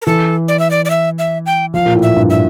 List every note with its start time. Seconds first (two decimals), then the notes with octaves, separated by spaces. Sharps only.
0.02 A#4
0.06 E3 A4
0.48 D5
0.59 E5
0.71 D5
0.85 D5
0.90 E5
1.19 E5
1.46 G5
1.74 F3 F5
1.86 A#2
1.95 A2
2.02 E5
2.16 G2
2.30 E5